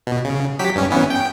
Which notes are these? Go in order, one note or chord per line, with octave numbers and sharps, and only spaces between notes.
B2
C#3
F#3 G4 B6
G2 C#4
E3 B3 C#4
G5